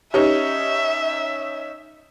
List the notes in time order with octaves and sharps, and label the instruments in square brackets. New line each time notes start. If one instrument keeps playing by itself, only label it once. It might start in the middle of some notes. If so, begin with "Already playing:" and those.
[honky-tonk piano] C#4 D#4 [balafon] G4 B4 [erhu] E5